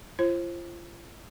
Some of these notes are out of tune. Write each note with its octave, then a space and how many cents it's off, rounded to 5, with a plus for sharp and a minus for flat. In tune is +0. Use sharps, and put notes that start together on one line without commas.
F4 -35 C5 +30